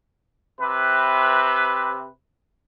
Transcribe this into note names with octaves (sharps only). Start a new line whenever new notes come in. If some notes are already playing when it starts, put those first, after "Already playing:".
C3 B4